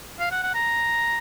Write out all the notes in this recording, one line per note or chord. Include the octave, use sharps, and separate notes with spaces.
F5
F#5
F#5
A#5